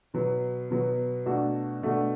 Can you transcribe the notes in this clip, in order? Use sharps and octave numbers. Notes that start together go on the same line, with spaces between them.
B2 F#3 B3
B2 F#3 B3
B2 A3 D4 F#4 A4
B2 A3 D4 F#4 A4